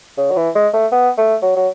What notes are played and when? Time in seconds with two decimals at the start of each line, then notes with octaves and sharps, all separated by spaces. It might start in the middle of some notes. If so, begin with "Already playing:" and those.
0.18 C#3
0.31 F#3
0.36 E3
0.55 G#3
0.74 A3
0.92 B3
1.18 A3
1.42 F#3
1.56 F#3